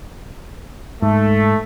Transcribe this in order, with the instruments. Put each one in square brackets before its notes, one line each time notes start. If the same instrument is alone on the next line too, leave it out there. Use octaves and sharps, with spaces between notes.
[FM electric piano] G#2 [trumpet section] A3